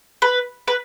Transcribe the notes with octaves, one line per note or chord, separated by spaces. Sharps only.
B4
B4